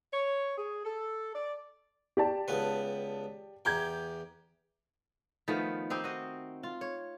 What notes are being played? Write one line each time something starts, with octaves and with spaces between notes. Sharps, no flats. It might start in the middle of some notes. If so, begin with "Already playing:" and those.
C#5
G#4
A4
D5
G4 D5 A5
C#2 B3 B4
E2 G4 G5 A#5 G6 G#6
D#3 F3 A3 B3
C4 D#4 G4 C5
F#4 D#5
F4
C#5